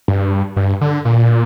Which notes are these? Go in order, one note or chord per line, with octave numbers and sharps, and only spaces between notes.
G2
G2
D3
A#2